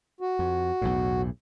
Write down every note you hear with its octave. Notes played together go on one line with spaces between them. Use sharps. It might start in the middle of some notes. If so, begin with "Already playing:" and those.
F#4
F2
B1 E2 A2